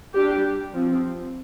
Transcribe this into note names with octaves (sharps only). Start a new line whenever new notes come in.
G3 D4 G4
F3 C4